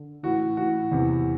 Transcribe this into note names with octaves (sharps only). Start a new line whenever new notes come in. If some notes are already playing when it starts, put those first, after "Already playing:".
Already playing: D3
A2 E3 F#4
A2 E3 F#4
E2 C3 E3